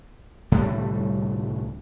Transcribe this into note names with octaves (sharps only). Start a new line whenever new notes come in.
C2 A2 D3 G3